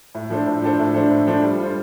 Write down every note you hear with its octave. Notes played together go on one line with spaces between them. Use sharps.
A2
F3 D4 A4 C5
A2
F3 D4 A4 C5
A2
F3 D4 A4 C5
A2
F3 D4 A4 C5
G3
F4 C5